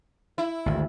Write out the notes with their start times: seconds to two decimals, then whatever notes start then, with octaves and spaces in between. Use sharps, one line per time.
0.38 E4
0.66 G#1 D2